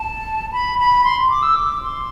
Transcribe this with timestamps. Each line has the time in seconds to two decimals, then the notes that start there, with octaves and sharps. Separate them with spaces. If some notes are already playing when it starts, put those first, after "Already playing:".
Already playing: A5
0.52 B5
0.79 B5
1.04 C6
1.30 D6
1.42 E6
1.56 D6
1.82 C6